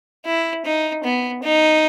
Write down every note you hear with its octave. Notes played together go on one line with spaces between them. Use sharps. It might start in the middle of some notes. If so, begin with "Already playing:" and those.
E4
D#4
B3
D#4